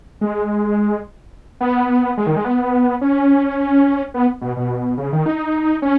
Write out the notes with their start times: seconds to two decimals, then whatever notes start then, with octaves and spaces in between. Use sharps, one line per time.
0.21 G#3
1.61 B3
2.17 G#3
2.27 D#3
2.36 G#3
2.45 B3
3.01 C#4
4.14 B3
4.41 B2
4.56 B2
4.97 C#3
5.12 D#3
5.26 D#4
5.82 C#4